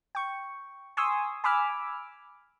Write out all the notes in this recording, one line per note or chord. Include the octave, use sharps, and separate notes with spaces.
G5 C#6
G#5 C6 C#6 D#6 E6
G#5 B5 D6 E6 F6